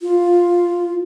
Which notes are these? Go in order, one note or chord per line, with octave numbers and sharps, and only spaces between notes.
F4